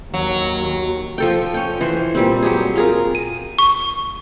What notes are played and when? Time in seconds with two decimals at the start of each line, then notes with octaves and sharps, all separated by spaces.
0.14 D#2 F#3
1.18 F3 A4 G5
1.54 C#4 G5
1.81 E3 C5
2.15 A#2 G3 C4
2.42 F#3 G4 G#4
2.75 F4 G#4 A#4
3.15 D#7
3.59 C#6